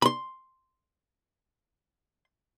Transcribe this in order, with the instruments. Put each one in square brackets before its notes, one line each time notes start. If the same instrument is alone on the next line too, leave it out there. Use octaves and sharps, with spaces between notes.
[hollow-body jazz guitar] B5 C6